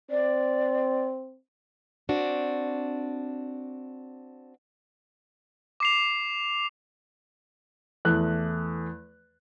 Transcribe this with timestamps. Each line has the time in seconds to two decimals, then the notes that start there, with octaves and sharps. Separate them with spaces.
0.10 C4 D5
2.09 C4 D4 F#4
5.80 D6 C7 F7
8.05 E2 A3 F#6